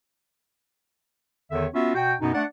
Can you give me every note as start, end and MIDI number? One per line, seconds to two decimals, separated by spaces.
1.52 1.66 40
1.52 1.66 50
1.52 1.66 51
1.52 1.66 73
1.52 1.66 76
1.74 1.95 59
1.74 1.95 61
1.74 1.95 65
1.74 1.95 66
1.74 1.95 76
1.96 2.15 47
1.96 2.15 66
1.96 2.15 79
2.21 2.32 42
2.21 2.32 47
2.21 2.32 59
2.21 2.32 63
2.35 2.44 57
2.35 2.44 62
2.35 2.44 74
2.35 2.44 78